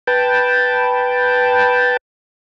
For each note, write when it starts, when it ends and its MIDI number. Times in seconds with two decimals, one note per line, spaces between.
0.07 1.97 71
0.07 1.97 79
0.07 1.97 81